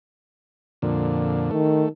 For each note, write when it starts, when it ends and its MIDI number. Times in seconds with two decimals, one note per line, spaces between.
0.82 1.51 41
0.82 1.51 46
0.82 1.51 50
1.51 1.87 51
1.51 1.89 57